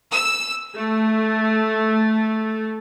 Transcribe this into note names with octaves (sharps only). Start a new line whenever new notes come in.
E6
A3